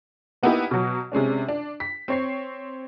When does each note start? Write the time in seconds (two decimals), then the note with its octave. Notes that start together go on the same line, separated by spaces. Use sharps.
0.43 A#3 B3 D#4 E4 G4 B4
0.71 B2 F#3
1.12 C3 G#3 C#4 D4
1.48 D4
1.80 B6
2.08 C4 C#5 C7